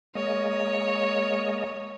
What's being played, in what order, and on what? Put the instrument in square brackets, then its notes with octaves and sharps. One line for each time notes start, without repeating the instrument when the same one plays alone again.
[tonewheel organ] G#3 A#3 D#5 [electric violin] C#5